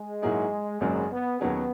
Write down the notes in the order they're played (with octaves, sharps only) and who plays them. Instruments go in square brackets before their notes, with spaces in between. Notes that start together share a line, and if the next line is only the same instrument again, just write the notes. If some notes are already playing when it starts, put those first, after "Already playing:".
Already playing: [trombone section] G#3
[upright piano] G#2 F#3 A#3 E4 G#4
[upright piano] G#1 F#2 C#3 F#3 A#3 [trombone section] G#3
[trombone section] B3
[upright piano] D#2 D#3 F#3 C#4 G#4 [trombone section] B3